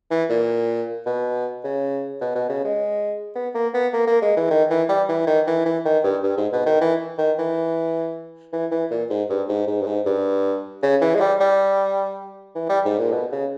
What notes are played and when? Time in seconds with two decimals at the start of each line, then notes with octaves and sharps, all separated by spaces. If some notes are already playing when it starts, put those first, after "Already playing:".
0.11 E3
0.30 A#2
1.06 B2
1.64 C#3
2.21 B2
2.35 B2
2.49 C#3
2.65 G#3
3.36 B3
3.55 A#3
3.74 B3
3.93 A#3
4.07 A#3
4.22 G#3
4.37 E3
4.51 D#3
4.70 E3
4.89 G3
5.09 E3
5.27 D#3
5.47 E3
5.66 E3
5.85 D#3
6.04 G2
6.23 G2
6.37 G#2
6.53 B2
6.66 D#3
6.81 E3
7.18 D#3
7.38 E3
8.53 E3
8.72 E3
8.91 A#2
9.10 G#2
9.30 G2
9.49 G#2
9.67 G#2
9.82 G2
9.87 G#2
10.06 G2
10.83 C#3
11.01 E3
11.15 G#3
11.21 G3
11.40 G3
12.55 E3
12.69 G3
12.85 G#2
12.99 A#2
13.12 B2
13.32 C#3